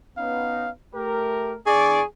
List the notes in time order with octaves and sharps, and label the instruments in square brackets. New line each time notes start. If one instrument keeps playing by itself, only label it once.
[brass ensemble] B3 C#4 D#4 [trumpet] F5
[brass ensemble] A3 A#4 [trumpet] G4
[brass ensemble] E2 D4 D5 [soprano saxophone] G#4 [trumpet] C#6